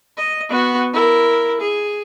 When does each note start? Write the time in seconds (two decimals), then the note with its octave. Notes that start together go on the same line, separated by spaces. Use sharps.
0.17 D#5
0.49 B3 F#4
0.93 E4 A#4
1.61 G#4